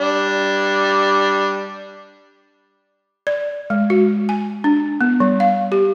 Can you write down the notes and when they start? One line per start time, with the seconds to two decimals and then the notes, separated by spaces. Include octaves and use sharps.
0.01 G3 D4
3.27 D5
3.70 G#3
3.90 F#4
4.29 G#5
4.64 D4
5.01 B3
5.20 G3
5.40 F5
5.72 G4